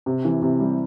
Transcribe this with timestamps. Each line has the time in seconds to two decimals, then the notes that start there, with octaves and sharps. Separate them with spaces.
0.06 C3
0.25 E3
0.42 C3
0.60 G3